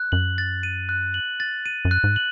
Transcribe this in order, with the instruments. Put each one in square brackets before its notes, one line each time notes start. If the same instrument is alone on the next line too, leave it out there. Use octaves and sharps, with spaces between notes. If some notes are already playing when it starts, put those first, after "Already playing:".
Already playing: [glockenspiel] F#6
[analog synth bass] F#2 [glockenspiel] F#7
[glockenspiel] A6
D#7
F#6
F#7
A6
D#7
[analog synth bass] F#2
[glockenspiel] F#6
[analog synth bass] G#2
[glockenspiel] F#7